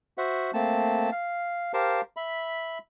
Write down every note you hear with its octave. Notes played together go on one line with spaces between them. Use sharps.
F#4 C5 E5 F#5
A3 A#3 C4 A5
F5
G4 A#4 C5 F5 A5
E5 B5